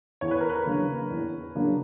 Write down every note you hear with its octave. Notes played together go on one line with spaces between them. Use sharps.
E2 C#5
B4
A#4
B4
C#3 F#3 A#3 D4
E2
C#3 F#3 A#3 D4